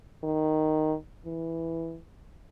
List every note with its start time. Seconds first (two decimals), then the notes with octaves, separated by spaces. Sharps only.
0.23 D#3
1.26 E3